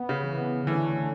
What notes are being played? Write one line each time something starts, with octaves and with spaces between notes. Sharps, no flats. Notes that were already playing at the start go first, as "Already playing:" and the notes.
Already playing: B3
C#3
E3 B3
D3 E3 A3 C#4